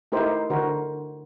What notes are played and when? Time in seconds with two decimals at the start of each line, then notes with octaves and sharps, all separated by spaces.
0.12 A3 D#4 E4 G4 A#4 C5
0.50 D3 F#4 A#4 C5